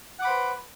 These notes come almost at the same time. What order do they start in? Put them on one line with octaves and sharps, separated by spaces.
F#5 D6 B5 C5 B4